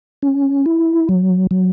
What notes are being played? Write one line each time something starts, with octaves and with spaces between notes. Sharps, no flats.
C#4
E4
F#3
F#3